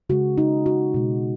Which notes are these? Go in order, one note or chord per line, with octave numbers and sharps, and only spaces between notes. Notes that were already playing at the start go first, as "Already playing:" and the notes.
C#3 G#3 F#4
D#4
F#4
B2 G#3